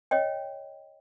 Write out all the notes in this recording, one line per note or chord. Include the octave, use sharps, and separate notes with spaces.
C#5 D#5 G5